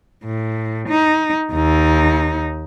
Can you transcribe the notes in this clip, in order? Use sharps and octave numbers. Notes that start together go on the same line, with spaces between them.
A2
D#4
D#2 D#4